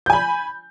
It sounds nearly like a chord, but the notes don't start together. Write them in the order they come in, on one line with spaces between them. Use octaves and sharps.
G6 G#5 B5